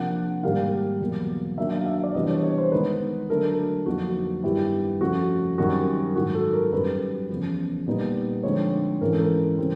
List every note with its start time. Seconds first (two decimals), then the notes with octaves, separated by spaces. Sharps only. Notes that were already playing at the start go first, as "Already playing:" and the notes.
Already playing: C3 F3 A#3 D4 F#5
0.43 G#2 D#3 G3 A#3 D#4 F5
1.00 E2 B2 F#3 A#3
1.57 D#3 F#3 A#3 D4 E5
1.74 F5
1.86 E5
2.04 D5
2.14 C3 E3 G3 B3 D4 D#5
2.29 C#5
2.43 C#5
2.58 C5
2.72 D#3 G#3 B3 D#4 B4
3.30 D3 F#3 A3 D4 A#4
3.86 F2 D3 F#3 A#3 D#4 F#4
4.43 G2 D#3 G3 B3 E4 G4
5.01 F2 C#3 F3 A3 F#4
5.58 F#2 D#3 G3 C4 F#4
6.15 G#2 D#3 F#3 F#4
6.35 A4
6.53 A#4
6.73 F#2 D#3 G3 B4
7.29 E2 C#3 F3
7.87 A#2 G3 B3 D#4
8.43 D3 F3 G#3 C4 D#4 C#5
9.01 G#2 E3 G#3 C#4 E4 A#4
9.12 A4
9.20 A#4
9.58 C#3 E3 G3 C4